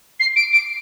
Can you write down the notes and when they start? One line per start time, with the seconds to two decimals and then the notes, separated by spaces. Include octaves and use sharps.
0.19 C7
0.36 D7
0.52 D7